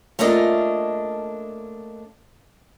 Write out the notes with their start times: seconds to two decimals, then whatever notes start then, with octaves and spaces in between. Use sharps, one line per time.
0.19 A3 A#3 C#4 D4 F4 D#5